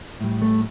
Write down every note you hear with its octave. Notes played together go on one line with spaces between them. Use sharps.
A2 G3
A3